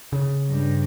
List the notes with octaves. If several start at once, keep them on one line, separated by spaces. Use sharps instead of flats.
C#3
G2